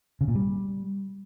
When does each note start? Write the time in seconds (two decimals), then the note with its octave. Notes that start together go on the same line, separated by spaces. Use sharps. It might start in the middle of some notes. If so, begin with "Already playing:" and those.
0.21 C#3
0.28 A#2
0.35 G3